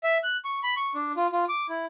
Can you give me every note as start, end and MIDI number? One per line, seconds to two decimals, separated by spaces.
0.04 0.18 76
0.24 0.37 90
0.45 0.60 85
0.63 0.74 83
0.77 0.93 85
0.95 1.12 62
1.17 1.27 65
1.32 1.45 65
1.49 1.67 86
1.69 1.86 64